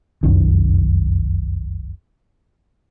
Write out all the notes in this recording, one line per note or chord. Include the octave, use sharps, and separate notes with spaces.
F1 C2 F#2 D#3